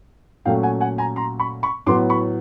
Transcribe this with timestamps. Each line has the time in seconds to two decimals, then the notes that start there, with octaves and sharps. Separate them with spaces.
0.45 A#2 F#3 A3 C#4 F5 G5
0.63 F#5 G#5
0.80 F#5 G#5
0.98 G#5 A#5
1.16 A#5 C6
1.40 B5 C#6
1.63 B5 C#6
1.86 A2 F#3 B3 C6 D6
2.10 B5 C#6